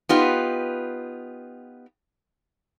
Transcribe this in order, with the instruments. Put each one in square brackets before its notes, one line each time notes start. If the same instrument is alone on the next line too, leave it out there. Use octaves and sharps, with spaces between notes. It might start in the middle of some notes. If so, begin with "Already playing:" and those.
[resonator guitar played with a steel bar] B3 D#4 F4 G4 B4